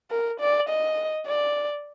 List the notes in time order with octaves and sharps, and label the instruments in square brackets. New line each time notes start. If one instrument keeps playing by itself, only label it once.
[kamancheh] A#4
D5
D#5
D5